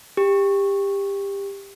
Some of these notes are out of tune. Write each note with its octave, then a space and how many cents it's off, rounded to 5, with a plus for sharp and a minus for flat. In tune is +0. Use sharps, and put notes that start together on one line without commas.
G4 +20